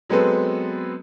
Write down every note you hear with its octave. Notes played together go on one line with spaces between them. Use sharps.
F#3 G#3 B3 C4 A4 B4